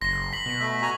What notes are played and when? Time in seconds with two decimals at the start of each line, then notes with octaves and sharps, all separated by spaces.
0.02 F#1 C6 A#6
0.33 B6 F#7
0.46 B2
0.60 A3 E5
0.82 F#4 G#5 A#5